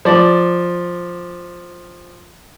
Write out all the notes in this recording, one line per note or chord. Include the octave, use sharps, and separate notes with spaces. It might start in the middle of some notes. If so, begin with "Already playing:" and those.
F3 D5